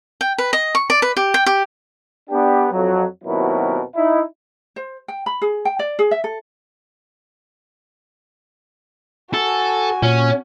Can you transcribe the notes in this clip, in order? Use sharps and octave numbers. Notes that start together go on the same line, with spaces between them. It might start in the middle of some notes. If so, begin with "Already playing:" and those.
G5
B4
D#5
C#6
D5
B4
G4
G5
G4
B3 D4 G4
F2 F#3
D#2 B2 F#3 C4 E4 A#4
D#4 E4
C5
G5
B5
G#4
G5
D5
G#4
E5
A4
F#4 A4 G#5
A#2 C#4